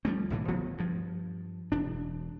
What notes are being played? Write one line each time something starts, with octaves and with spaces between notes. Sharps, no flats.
F3 G3 A3 C4
B1 A2 D3 E3
D1 F3 F#3 B3
G2 F3
E1 D4